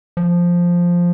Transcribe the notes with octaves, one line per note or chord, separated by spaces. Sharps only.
F3